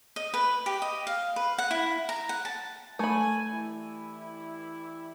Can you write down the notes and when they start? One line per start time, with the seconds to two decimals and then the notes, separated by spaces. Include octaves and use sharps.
0.16 D#5
0.34 B4
0.66 G4
0.82 D#5
1.07 F5
1.36 B4
1.58 F#5
1.71 E4
2.09 A#5
2.29 F#5
2.45 A5
2.99 A3 G#5 B5
3.52 E3 G3 E4